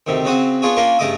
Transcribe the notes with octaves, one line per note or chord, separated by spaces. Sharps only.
D2 C3 D#3
C#3 F#3 C4 F#4 D#6
B3 D4 F4 G#4 C#5
A#3 C#4 D4 F4 A#4
G2 C#3 A3 D#5 D6 D#6